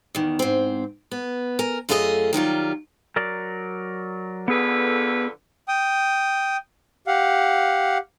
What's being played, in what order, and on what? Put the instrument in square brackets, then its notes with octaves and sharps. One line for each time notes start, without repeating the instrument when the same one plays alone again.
[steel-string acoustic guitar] E2 D#3
G#2 C4
B3
A#4 G#5
F#2 A3 F4 G#4 A4 D#5
D#3 F#3 G3 F4
[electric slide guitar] F#3 A#4 D5
[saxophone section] F2 D3 B4 [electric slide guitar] B3 G#4
[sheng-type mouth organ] G5 D#6
G4 F5 F#5